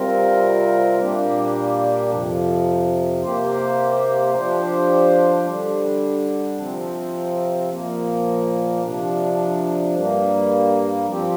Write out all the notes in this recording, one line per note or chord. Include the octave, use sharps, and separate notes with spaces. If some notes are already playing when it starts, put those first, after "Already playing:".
Already playing: C3 G3 C4 F4 A#4
A#2 G3 A#3 D4 G4
F2 C3 F3
C3 A#3 G4 C5
F3 D4 G4 C5
D3 G3 D4
C3 F3 C4
A#2 F3 A#3
C3 F3 D4
G2 G3 A#3
F3 C4 G4